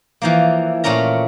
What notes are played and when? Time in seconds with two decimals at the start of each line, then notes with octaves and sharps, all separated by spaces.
0.22 E3 F3 A#3
0.84 A#2 A3 C#4 A#4 A#5